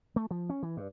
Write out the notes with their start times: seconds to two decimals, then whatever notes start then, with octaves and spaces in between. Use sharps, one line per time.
0.16 A3
0.31 F3
0.50 C#4
0.63 E3
0.77 G2